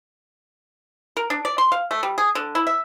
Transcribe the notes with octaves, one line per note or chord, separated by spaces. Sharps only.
A#4
D4
D5
C6
F5
A3
G3
G#4
D3
E4
E5